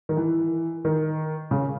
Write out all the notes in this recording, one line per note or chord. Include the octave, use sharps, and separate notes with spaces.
D#3
E3
D#3
C#3